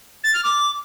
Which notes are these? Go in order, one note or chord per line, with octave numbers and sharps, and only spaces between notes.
A6
F6
D6